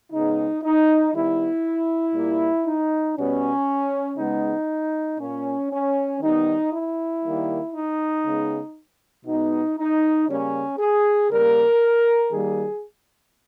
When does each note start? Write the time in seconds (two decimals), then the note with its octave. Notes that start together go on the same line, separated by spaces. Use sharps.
0.12 C#3 G#3 B3 D#4
0.63 D#4
1.13 D#3 G3 B3 E4
2.15 A#2 G3 A#3
2.65 D#4
3.17 B2 G3 B3 C#4
4.18 C#3 G#3 B3 D#4
5.20 A#2 A#3 C#4
5.71 C#4
6.21 D#3 G3 B3 D#4
6.72 E4
7.23 D#3 G3 A#3
7.73 D#4
8.25 C#3 G#3 B3
9.26 B2 G#3 B3 D#4
9.77 D#4
10.27 C#3 G3 A#3 C#4
10.78 G#4
11.29 C#3 G3 A#3 A#4
12.30 D#3 G3 A#3 G#4